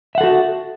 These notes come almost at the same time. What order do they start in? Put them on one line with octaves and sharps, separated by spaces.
E5 F#5 A4 F#4